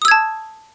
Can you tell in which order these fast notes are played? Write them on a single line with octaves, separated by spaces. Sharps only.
D#6 E6 G#6 A5